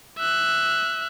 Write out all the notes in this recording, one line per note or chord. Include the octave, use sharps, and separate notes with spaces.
E5 F#6